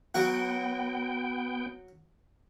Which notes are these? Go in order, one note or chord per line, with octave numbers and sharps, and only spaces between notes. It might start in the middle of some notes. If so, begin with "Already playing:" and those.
F#3 B3 F#4 G5